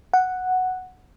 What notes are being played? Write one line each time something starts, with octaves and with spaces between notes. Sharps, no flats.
F#5